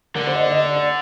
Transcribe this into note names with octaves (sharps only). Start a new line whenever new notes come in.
D3 A#4
C5
D#5
D5
D#5
D5
D5